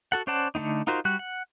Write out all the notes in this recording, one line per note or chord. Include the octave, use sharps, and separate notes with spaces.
F#4 A4 F#5
C#4 C5 D5 F#5 A5
D3 A3 C4 D#4
D#4 F4 F#4 A#4 C5
G3 F#4 F#6
F#5